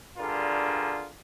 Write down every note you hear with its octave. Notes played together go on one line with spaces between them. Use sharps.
G2 D3 F4 G#4 A#4